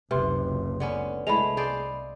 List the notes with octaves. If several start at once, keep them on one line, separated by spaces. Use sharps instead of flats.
F#1 C#2 C3 B4 C6
D3 B3 C#4
C2 G#3 A3 E4 B5 F7
G#4 C5 D5